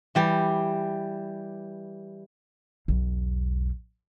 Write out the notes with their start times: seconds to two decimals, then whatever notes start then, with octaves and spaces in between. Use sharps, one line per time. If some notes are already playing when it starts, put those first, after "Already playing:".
0.15 E3 G3 G4
2.88 B1 E2